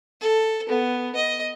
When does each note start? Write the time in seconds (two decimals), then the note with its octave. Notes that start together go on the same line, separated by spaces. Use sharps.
0.21 A4
0.69 B3
1.15 D#5